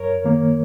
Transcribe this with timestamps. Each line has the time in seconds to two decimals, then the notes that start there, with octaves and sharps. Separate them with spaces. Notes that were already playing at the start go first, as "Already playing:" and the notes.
Already playing: F#2 A#4 C#5
0.24 D#3 A#3